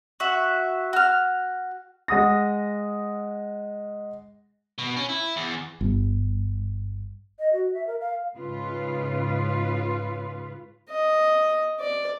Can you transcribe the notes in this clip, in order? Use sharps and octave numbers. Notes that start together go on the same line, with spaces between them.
F#4 E5
F#4 F6
G#3 F#5 D#6 A#6
B2
C#4
E4
E2
G1
D#5
F#4
E5
A#4
F5
G#2 C#3 F4 B4
D#5
D5